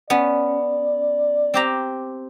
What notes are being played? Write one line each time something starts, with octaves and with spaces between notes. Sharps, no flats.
B3 C#4 D5
C4 G4 A#5